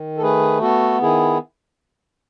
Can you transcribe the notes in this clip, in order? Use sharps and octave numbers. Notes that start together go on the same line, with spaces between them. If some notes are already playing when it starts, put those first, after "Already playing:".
Already playing: D#3
A4
A3 G#4 B4
B3 F#4 A4
D#3 E4 G#4